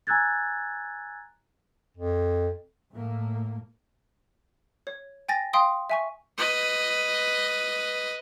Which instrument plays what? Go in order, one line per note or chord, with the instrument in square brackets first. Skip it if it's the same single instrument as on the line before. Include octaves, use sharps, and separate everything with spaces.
[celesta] G#5 A#5 E6 F#6 G#6 A6
[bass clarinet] F2
[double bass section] A2 A#3
[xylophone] C#5
G5 G#5 A6 A#6
F5 G5 C6 D#6
E5 G#5 C#6
[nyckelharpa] B4 D#5